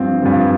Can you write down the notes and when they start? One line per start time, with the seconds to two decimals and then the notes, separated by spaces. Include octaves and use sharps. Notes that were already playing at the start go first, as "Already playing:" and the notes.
Already playing: G2 F3 C4
0.22 G2 F3 C4